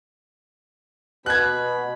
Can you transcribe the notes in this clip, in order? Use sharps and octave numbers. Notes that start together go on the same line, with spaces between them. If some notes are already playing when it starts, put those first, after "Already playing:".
B2 B5 F#6 G#6